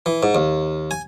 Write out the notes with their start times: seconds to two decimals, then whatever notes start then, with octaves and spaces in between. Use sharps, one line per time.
0.06 E3
0.23 G#2
0.35 D#2
0.91 G#5